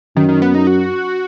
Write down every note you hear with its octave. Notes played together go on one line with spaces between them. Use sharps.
F#2 D#3
D#3
B3
D#4
F#4